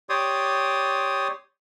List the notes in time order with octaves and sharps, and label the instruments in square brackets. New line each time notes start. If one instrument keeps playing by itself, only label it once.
[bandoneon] G4 C#5 D5 C6 D#6